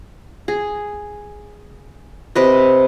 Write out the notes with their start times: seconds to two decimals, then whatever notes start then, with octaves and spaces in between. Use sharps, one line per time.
0.48 G#4
2.35 C3 B4 D#5